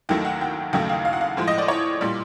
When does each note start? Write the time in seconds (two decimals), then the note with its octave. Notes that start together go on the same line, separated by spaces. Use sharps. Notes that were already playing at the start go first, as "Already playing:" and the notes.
0.09 D#2 D#3 F#3 A3 G5
0.25 F#5
0.41 G5
0.73 D#2 C#3 F#3 A3 G5
0.89 F5
1.05 F5
1.13 F#5
1.21 F5
1.37 A2 F3 G#3
1.48 D#5
1.58 D5
1.68 C#5
2.01 A#2 G3